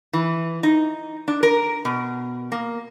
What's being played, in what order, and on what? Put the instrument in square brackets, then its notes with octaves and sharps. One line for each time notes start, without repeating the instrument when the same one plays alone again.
[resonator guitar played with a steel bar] E3
D#4
D4
A#4
B2
A#3